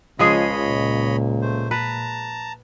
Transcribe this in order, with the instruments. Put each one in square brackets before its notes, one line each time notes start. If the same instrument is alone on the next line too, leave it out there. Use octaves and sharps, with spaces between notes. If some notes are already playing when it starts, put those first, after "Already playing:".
[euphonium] C#2 [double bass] C#3 [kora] F3 G#3 G#4 [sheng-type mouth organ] C#5 D#5 B5
[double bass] A#2
[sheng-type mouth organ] A3 C5
[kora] B4 [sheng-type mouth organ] A5 A#5